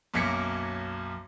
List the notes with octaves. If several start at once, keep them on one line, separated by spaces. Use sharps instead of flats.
B1 F#2 A#3 G#6 B6 C#7